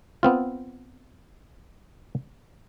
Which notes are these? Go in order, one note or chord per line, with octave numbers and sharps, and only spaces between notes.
B3 C4 F4